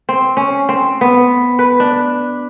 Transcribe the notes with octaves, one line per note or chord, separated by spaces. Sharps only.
C4
C#4
C4
B3
B4
D4